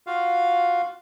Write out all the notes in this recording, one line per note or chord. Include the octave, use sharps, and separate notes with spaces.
F4 F#4 F5